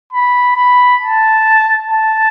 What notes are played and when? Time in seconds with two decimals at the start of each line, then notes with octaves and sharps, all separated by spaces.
0.12 B5
0.56 B5
1.01 A5
1.88 A5